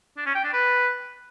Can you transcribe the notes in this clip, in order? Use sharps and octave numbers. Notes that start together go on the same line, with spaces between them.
D4
C#4
G5
D4
B4